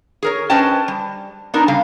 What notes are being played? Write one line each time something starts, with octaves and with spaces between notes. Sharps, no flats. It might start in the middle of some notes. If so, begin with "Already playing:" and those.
G#4 A#4 C#5
C#4 B4 C5 D#5 G5 A5
G3
B3 D4 D#4 A#4
C#3 G3 A4 F5